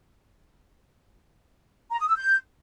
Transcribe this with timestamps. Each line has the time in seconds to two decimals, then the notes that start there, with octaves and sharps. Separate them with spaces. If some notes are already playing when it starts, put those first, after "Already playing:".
1.91 A#5
1.99 D#6
2.08 E6
2.17 G6